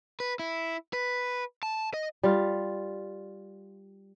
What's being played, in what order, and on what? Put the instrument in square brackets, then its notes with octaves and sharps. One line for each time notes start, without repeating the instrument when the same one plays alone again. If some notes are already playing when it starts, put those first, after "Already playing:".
[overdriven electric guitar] B4
E4
B4
A5
D#5
[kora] G3 F4